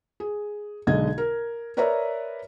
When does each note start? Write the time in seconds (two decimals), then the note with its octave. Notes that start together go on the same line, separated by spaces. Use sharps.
0.20 G#4
0.87 B1 D3 G#3 D#5 G#6
1.18 A#4
1.77 A#4 B4 C#5 D5 E5 A#5